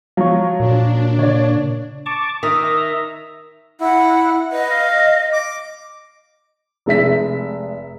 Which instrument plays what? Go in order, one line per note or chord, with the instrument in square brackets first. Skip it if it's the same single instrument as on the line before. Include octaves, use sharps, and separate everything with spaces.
[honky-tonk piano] F3 F#3 [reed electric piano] F5 C#6
[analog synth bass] A#2 [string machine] D4
[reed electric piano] C#3 [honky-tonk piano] C#5 D5
[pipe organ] A5 C#6 D6
[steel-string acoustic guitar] D#3 [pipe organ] E5 A#5 [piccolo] D#6
[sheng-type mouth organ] E4 [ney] F#5
[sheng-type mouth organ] B4 [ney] D#5
[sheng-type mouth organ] F5
D6
[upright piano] F1 G#3 E5 B6